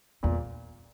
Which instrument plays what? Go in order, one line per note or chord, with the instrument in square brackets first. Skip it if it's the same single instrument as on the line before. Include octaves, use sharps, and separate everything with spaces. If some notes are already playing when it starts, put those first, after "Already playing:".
[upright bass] E2 [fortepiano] A#2